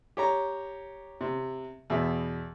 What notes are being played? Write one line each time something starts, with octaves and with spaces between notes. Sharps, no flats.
G4 C#5 A#5
C3
E2 B2 E5